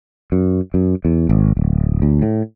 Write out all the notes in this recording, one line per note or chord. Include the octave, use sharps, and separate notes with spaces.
F#2
F#2
E2
G#1
D1
D2
A2